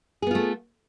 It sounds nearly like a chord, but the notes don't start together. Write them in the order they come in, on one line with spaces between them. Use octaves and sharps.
G#4 B3 F4 A3